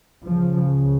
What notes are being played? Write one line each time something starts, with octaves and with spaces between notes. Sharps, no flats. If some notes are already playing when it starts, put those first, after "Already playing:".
C#2 C#3 F3